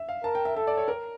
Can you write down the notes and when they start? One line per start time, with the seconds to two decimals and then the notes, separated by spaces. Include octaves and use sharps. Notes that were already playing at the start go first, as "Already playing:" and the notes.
Already playing: E5
0.09 F5
0.24 A#4 A5
0.35 G5
0.45 E5
0.57 A4 E5
0.67 D5
0.77 C#5
0.88 A#4